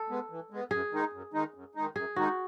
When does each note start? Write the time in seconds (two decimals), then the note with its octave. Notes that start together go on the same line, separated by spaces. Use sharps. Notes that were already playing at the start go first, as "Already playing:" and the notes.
Already playing: A4
0.09 G#3 B3
0.30 E3
0.50 G#3 B3
0.71 F#2 G#4
0.91 D#3 G#3 D#4
1.12 F#2
1.33 D#3 G#3 D#4
1.54 F#2
1.75 D#3 G#3 D#4
1.95 F#2 G#4
2.16 D#3 G#3 D#4 F#4